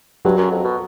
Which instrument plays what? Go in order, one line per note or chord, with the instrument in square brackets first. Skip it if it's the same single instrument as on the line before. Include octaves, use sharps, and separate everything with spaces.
[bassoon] G2 [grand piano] F#3
[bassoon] F#2
F2
B2